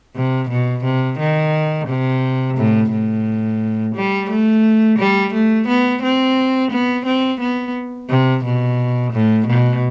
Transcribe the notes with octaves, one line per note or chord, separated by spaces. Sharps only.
C3
B2
C3
D#3
C3
A2
A2
G3
A3
G3
A3
B3
C4
B3
C4
B3
C3
B2
A2
B2